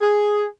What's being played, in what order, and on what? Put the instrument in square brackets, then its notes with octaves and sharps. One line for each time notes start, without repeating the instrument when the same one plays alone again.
[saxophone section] G#4